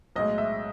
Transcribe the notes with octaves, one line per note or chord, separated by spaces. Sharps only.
B1 A2 G#3 D#5
E5